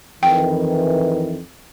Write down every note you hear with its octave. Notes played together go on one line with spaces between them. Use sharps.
F2 D#3 E3 G5